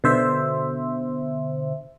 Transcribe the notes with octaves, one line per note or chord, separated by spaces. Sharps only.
B2 D3 C5 E5